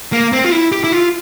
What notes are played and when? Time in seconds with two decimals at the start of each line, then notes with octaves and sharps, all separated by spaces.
0.13 A#3
0.33 C4
0.45 F4
0.52 E4
0.72 G4
0.84 E4
0.92 F4